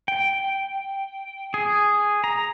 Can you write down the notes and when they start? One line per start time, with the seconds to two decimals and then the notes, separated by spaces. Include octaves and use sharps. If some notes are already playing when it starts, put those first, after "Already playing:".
0.08 G5
1.54 G#4
2.24 A#5